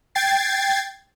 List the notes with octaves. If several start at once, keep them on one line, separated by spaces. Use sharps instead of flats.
G5 G#6 A6 C7